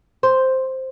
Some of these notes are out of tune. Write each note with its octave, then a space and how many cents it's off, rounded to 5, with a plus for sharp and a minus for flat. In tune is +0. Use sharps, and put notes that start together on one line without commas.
C5 +0